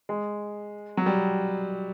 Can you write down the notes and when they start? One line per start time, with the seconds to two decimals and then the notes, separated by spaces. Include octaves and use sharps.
0.09 G#3
0.97 F#3
1.06 G3